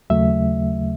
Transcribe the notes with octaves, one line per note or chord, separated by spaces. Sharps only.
D#2 C#3 F#3 A3 E5